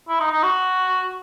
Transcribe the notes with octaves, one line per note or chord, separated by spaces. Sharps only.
E4
D#4
D#4
F#4